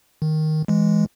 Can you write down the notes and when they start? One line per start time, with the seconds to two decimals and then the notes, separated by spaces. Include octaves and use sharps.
0.22 D#3
0.68 E3 G#3